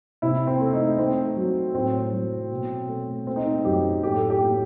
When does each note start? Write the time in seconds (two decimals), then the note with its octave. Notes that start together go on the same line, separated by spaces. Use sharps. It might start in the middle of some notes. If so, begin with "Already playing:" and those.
0.22 C3 E4
0.47 C4
0.60 A3
0.73 D#4
0.99 A3 C4
1.36 F#3
1.74 A2 C4
2.13 F#3
2.51 B2
2.88 A3
3.27 A3 C4
3.36 D#4
3.46 C4
3.65 F#2 G4
4.02 A2 G4
4.16 A4
4.30 G4
4.41 A2